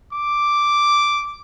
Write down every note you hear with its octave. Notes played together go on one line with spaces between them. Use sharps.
D6